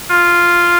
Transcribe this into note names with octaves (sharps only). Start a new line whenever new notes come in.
F4